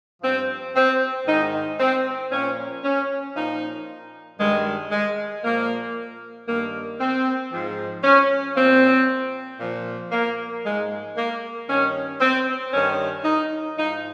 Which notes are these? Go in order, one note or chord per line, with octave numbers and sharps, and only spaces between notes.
G2 F3 C4
C4
G#2 D#3 D#4
C4
A#2 F3 C#4
C#4
A#2 F3 D#4
G2 D#3 G#3
G#3
A#2 F3 A#3
G2 D#3 A#3
C4
G#2 F3
C#4
A#2 F3 C4
A#2 F3
A#3
G#2 F3 G#3
A#3
G2 D#3 C#4
C4
G2 D#3 C#4
D#4
G#2 F3 D#4